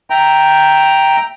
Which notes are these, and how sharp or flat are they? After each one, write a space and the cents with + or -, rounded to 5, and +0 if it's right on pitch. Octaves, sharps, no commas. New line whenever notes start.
E5 +0 G5 +0 A#5 +0